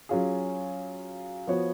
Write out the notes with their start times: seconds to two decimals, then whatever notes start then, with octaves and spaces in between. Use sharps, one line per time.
0.09 F#3 C#4 F4 G#4
1.47 F3 B3 F#4 C#5